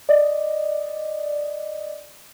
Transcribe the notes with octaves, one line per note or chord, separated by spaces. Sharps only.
D5 D#5